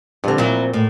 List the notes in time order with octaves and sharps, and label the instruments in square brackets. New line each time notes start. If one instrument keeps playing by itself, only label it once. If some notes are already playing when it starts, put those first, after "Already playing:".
[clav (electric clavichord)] G2 D3 [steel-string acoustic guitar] F3 C4
[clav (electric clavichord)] A#2 [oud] F#3 E4
[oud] A2